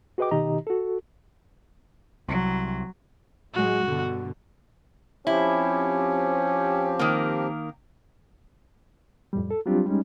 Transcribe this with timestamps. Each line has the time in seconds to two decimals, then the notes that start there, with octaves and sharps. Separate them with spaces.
0.18 F#4 G#4 B4 D#5 G5 D6
0.31 B2 D#3 D#4 G4 D#5 A#5
0.67 F#4 A4
2.29 C2 F#3
3.54 A2 F#3 G#3 F#4
3.84 G2 B2 D3
5.27 F3 C4 C#4 E4 G4
6.99 D#3 A#3
9.33 F2 A2 G3
9.51 A4
9.66 F#3 G3 C4 D4 F4 G4
9.86 G3 G#3 C#4 D#4